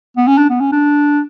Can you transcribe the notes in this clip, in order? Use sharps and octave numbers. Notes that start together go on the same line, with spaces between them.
B3
C#4
D4
B3
C#4
D4